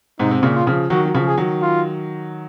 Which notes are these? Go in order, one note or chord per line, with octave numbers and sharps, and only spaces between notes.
G#2 C3 D#4
C3
A#2 C#3
F4
C#3 F3
D#3 F#3 F#4
F#3
C#3 F3
G#4
D#3 F#3
F4